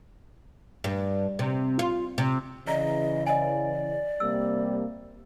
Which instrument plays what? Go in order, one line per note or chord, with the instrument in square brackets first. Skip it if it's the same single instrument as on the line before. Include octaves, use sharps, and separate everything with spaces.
[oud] G2
C3
F4
C3
[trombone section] C#3 E3 [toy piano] D5 A#5 [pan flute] D#5
[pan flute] D5 [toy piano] D#5 G#5
[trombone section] C3 G3 A#3 [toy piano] E6